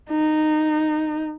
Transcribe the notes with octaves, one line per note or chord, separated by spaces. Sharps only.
D#4